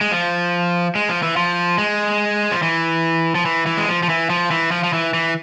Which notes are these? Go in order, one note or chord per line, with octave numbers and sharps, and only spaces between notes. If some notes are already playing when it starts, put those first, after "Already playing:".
G#3
F3
G#3
F3
E3
F3
G#3
F3
E3
F3
E3
E3
G#3
F3
F3
E3
F3
E3
F3
F3
E3
E3